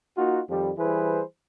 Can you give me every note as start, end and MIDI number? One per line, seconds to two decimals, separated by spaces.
0.17 0.41 58
0.17 0.41 63
0.17 0.41 65
0.17 0.41 66
0.49 0.72 41
0.49 0.72 51
0.49 0.72 53
0.49 0.72 55
0.78 1.22 52
0.78 1.22 55
0.78 1.22 64
0.78 1.22 68
0.78 1.22 71
0.78 1.22 72